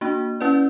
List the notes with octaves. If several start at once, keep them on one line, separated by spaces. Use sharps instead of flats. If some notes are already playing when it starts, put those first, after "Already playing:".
A#3 D4 F#4
C#4 E4 B4 D5